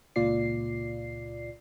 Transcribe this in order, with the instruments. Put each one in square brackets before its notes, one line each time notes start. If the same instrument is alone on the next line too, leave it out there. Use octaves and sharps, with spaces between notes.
[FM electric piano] C#2 A#2 F4 D5 C7